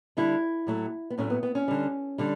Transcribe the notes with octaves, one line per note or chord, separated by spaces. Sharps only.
D3 G3 E4
A2 F#3 A3
B3
A2 F#3 A3 C#4
B3
B3
C#4
D3 G3
D3 G3